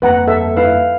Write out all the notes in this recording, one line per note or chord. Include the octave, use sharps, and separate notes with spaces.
G1 F2 A#3 B4 F#5 A#5
A4 E5
E4 B4 F5